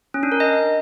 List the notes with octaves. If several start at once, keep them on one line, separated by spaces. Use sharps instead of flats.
C#4
D4
A#4
D#5